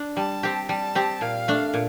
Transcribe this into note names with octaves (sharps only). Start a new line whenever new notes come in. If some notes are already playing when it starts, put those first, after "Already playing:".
Already playing: D4
G3 A5
C4 G4
G3 A5
C4 G4
A#2 F5
A3 D4
A#2